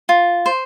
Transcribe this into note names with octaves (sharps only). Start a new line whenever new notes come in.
F4
C5